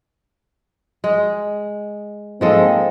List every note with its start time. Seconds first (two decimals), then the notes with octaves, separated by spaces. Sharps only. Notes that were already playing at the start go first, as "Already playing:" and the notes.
1.04 G#3
2.41 G#2 F3 G#3 A#3 C4 A4